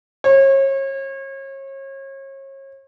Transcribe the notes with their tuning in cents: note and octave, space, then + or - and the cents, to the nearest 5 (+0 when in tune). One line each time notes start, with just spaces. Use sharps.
C#5 -35